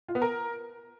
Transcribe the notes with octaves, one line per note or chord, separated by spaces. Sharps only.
F4
B3
A#4